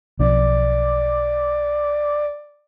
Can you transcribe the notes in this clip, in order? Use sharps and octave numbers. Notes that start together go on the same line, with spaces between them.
B1 F3 D4 D5